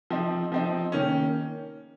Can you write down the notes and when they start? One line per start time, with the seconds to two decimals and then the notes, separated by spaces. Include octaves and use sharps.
0.10 F3 C4 D#4
0.52 F3 C4 D#4
0.92 D#3 A#3 C#4